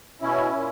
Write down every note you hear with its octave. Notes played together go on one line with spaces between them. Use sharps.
B2 C#4 E4
A#2